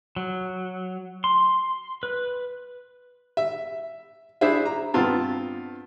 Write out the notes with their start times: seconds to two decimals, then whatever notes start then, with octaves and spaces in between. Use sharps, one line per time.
0.16 F#3
1.24 C6
2.03 B4
3.37 E5
4.41 D4 E4 G#4 C5 E5
4.65 A#5
4.94 G2 B3 C4 F4 A5